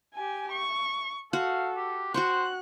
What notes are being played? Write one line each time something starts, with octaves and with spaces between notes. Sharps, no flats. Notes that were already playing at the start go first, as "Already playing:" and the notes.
G4 G#5
C#6
F#4 A4 F5
G4
F#4 C5 G5 C#6 F#6